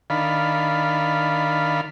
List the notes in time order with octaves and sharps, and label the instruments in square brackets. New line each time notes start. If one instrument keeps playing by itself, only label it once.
[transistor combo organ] D#3 D4 F5 B5